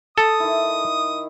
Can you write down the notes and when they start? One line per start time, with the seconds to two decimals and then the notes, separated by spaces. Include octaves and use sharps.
0.18 A4 D#6
0.40 D#3 E4